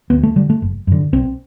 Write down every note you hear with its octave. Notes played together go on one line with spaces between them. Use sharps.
D2 B3
A3
D3 G3
A3
F#1
F#2 D3
B1 C4